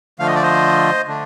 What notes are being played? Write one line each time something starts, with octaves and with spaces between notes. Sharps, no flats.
D3 F3 A3 F5
D#5
D5
C5 D#5
D3 A3 D4